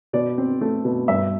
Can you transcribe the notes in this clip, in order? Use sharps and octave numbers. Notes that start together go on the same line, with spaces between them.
B2 D5
C4
A3
B2
G2 E5